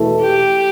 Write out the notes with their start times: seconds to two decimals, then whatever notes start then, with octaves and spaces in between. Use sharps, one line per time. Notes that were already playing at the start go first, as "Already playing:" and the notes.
Already playing: E2 B2 A3 E4 A4
0.21 G4